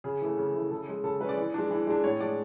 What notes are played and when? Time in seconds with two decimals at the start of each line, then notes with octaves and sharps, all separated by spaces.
0.04 C#3 G#4
0.21 E3 A3
0.37 C#3
0.54 E3 A3
0.71 C#3 A4
0.88 G#3 C#4
1.04 C#3 A4
1.21 G#3 B4
1.25 C#4 D5
1.37 E3
1.54 G#3 D4
1.71 E3
1.87 G#3 D4
2.04 A2 C#5
2.20 G#3 D4 D5